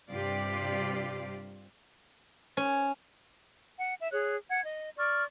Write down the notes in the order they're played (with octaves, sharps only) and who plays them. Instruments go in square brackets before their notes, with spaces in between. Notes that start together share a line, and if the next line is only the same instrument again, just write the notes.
[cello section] G2 C3 F4 G4 D5
[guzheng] C#4
[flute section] F#5
E5
G#4 C#5 F#6
F#5 G#6
D#5
D5 C#6 F6